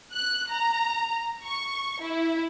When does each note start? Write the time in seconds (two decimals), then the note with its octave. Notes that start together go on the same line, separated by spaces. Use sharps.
0.12 F#6
0.49 A#5
1.44 C#6
2.02 E4